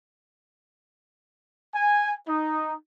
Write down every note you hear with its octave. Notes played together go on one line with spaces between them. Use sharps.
G#5
D#4